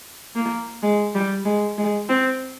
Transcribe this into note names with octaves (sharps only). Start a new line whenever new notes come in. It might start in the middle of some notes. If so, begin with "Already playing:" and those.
A#3
G#3
G3
G#3
G#3
C4